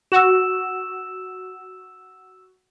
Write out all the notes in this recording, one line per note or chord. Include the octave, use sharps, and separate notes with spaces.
F#4 E6 E7